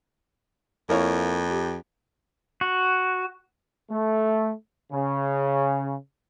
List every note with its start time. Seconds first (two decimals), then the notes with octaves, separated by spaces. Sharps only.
0.89 F2 A#3 E4 C#5
1.51 G4
2.61 F#4
3.89 A3
4.91 C#3